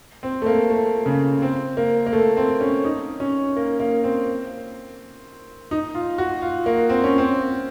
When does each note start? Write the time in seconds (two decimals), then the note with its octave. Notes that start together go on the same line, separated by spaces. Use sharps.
0.23 C4
0.42 A3
0.46 A#3
0.70 A3
1.06 C#3
1.42 C4
1.77 A#3
2.06 A#3
2.13 A3
2.37 C4
2.60 C#4
2.85 D#4
3.20 C#4
3.57 A#3
3.80 A#3
4.04 C4
5.71 D#4
5.95 F4
6.18 F#4
6.42 F4
6.66 A#3
6.90 C4
7.04 C#4
7.18 C4